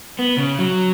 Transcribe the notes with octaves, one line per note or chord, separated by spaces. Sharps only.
B3
C#3
F#3